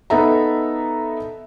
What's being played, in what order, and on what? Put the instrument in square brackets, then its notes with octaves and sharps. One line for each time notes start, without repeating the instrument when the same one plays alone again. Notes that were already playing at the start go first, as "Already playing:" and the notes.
[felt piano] B3 D#4 A4 E5 A#5